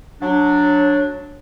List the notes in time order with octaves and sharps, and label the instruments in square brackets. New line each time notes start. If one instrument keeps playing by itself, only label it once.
[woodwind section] F#3 D4